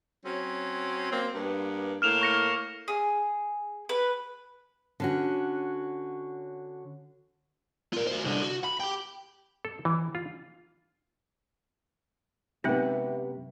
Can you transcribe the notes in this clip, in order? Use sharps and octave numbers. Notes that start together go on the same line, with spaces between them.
F#3 C4 C#4
A#3 C4
G2 A#3 B3
A2 A#3 F6 E7 F7
C#6 A#6 C#7
G#4
B4
D3 C#4 F#4
F4 A#4
F#4 C5
C2 D3
F#4
B5
G4 G5
A4
E3
F4
F#2 C3 G#3 B3 C4 D#4 G4 E5